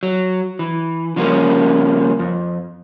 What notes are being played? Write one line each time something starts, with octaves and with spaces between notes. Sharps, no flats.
F#3
E3
C#3 F3 G3 A#3 C4 C#4
F2